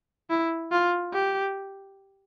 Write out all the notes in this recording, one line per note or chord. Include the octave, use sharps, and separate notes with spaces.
E4
F4
G4